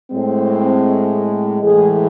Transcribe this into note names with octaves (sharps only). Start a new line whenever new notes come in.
A2 G#3 C4
A2 E3 G#3 G#4